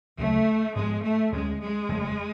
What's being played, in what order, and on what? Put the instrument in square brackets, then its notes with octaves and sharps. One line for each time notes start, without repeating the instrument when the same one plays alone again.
[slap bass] D2 C#3 F#3 [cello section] A3
[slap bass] G#2 F3 B3 [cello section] G#3
[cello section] A3
[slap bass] D2 D3 F#3 C#4 [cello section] G#3
[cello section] G#3
[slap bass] F#1 F2 F3 A3